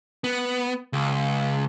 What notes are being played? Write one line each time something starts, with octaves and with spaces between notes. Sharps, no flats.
B3
C#2